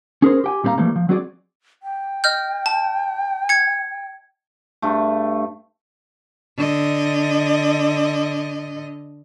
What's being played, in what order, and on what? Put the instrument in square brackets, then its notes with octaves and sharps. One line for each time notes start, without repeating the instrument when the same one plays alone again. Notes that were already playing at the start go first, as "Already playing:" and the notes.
[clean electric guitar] C#4 G#4 A#4 C5
G4 G5 G#5
A#2 G3 C4 A4 F5 A#5
E3 F3 G3 A3 A#3
F3
F#3 C4 F#4 G#4 C5 D5
[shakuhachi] G5
[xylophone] D#5 F6 G6
A5
G#6 C#7
[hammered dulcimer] G2 A3
[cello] D3 D#5